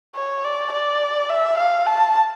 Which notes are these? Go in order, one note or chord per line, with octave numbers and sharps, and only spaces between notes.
C#5
D5
D5
E5
F5
A5